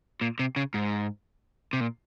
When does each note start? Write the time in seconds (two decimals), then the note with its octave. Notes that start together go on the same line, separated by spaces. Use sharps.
0.21 A#2
0.39 C3
0.56 C#3
0.74 G#2
1.73 C3
1.80 A#2